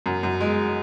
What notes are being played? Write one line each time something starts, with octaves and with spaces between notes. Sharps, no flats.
F#2
F#2
G#3